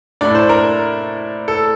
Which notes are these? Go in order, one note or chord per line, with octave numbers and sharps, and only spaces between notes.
A2 A3 D4 D5
C5
A#4
A4